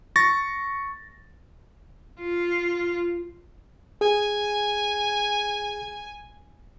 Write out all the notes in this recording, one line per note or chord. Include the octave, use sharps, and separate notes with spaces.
C#6 A6 A#6
F4
G#4 G#5